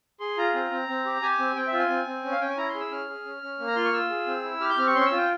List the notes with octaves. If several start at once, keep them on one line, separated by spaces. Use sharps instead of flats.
G#4 C6
F4 A#5
C4
C4
C4
G4
G4 G#5
C4
C4 G5
E5
F4
G#5
C4
C4
C#4
F5
C#4 G5
G#5
E4 A#5
C6
G#4
E6
C#4 F6
G#4
C#4
C#4
A#3
A#5
F4 C6
C#6
F4 E6
G#4
C4
E4
G4 F6
G6
C4 F6
C#6
C#4 C6
C#6
E6
F4
G5